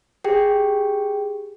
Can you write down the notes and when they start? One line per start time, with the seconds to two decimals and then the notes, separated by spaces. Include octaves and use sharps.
0.24 G4 G#4 G5